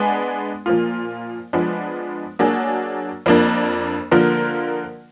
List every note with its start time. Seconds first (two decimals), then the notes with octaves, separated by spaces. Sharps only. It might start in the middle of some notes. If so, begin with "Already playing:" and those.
Already playing: G#3 B3 D4 G#4
0.66 A#2 F3 A#3 F4
1.53 F3 G#3 B3 D4
2.39 F#3 A#3 D4 G#4
3.26 F2 F3 A#3 D4
4.11 D3 F3 A#3 F4 A#4